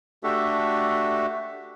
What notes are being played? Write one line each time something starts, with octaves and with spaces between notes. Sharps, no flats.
A3 D4 F#4 G4 A4 E5